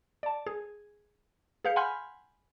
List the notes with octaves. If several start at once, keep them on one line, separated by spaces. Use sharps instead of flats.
D5 A5
G#4
G#4 B4 F5 G6 C#7
F#5 G#5 B5 C6 F6 G6